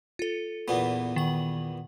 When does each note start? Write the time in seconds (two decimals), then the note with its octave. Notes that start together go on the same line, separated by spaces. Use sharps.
0.19 F4 A4
0.68 E2 A#2 B3
1.16 D#3 F#5 F#7